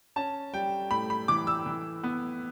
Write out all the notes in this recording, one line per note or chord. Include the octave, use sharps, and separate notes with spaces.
C#4 A5
G3 G5
A2 B5
B5
E3 D6
E6
E3
B3